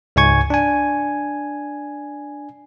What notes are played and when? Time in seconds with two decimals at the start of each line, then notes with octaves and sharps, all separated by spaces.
0.16 C#2 G#2 G#5 C#6 G#6
0.50 D4 G#5